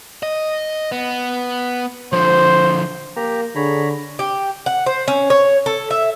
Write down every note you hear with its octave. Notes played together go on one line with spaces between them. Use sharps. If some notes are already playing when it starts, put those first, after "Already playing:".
D#5
B3
D3 F3 C5
A#3 G4 A#5
D3 G#4 C#5 A#5 B5
G4
F#5
C5
C#4
C#5
A4
E5